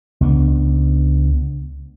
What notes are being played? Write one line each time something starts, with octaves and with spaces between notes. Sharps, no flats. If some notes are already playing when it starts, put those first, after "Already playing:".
C#2 B3 D4